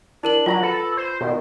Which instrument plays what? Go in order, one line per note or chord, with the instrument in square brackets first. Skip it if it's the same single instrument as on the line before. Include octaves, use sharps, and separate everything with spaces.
[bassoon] D4 [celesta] E4 A#4 F#7
[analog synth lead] F#3 [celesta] F4 A#6 F#7
[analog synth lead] A4 [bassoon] B4
[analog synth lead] C5
[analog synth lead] B2 [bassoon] D#3